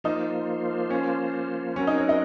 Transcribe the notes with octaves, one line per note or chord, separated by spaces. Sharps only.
F3 A#3 D#4 F4 C5
C#4
F#3 C4 C#4 F#4 A#4
D#4
C#5
D#5